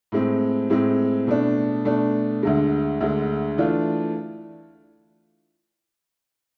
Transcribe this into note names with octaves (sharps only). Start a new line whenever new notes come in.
A2 G#3 C4
A2 G#3 C4
B2 A3 D4
B2 A3 D4
D2 D3 G#3
D2 D3 G#3
E3 A3 D4 F4